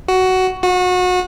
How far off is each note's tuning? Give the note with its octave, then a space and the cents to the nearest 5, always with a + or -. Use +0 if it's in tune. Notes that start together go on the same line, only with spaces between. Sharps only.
F#4 +10
F#4 -30